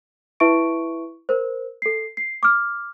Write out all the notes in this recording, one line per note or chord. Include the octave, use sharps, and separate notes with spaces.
E4 B4 E5 C#6 D7
A#4 C5
A4 C7
C7
D6 F6